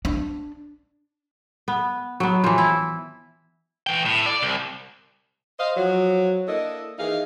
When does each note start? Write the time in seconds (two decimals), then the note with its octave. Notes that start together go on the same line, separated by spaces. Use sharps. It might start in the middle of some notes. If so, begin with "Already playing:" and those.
0.05 D4
1.68 B3
2.20 F#3 B3
2.44 E3 F3
2.58 E4
3.87 E3 G5
4.05 A2
4.26 D5
4.42 C2
5.59 C5 D#5 F5
5.77 F3 F#3
6.48 A#3 D4 E4 A4 D#5
6.99 D#3 E3 A#3 D#4 G#4 F5